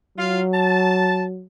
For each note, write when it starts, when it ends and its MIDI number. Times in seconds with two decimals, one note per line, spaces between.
0.18 1.45 54
0.18 0.41 65
0.18 0.41 77
0.53 1.22 81